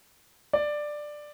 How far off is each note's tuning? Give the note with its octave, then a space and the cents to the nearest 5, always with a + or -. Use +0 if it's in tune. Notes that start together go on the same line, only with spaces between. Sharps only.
D5 +10